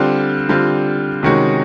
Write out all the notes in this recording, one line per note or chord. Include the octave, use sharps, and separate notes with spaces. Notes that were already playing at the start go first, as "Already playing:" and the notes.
Already playing: D3 G3 C4 F4
D3 G3 C4 F4
C3 D#3 G#3 C#4 F#4